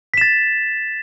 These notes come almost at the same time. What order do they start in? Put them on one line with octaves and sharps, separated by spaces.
B6 E7 A6